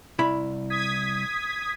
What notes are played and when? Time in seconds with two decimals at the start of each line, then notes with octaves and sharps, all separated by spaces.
0.19 C2 E4 B5
0.70 D#6 G#6 B6